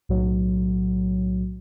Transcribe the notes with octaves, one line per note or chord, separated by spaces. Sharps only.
B1 A2 F#3